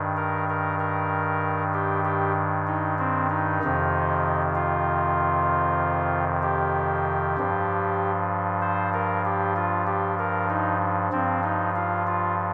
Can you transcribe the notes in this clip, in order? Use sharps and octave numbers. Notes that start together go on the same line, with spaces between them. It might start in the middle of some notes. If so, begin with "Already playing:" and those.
Already playing: G2 D#3
A#4
A#4
A#4
G4
G4
D#4
C4
D#4
F2 C3 D#3
F4
G4
G2 F3
C5
A#4
G4
F4
G4
A#4
D#4
G2 F3 C4
D#4
F4
F4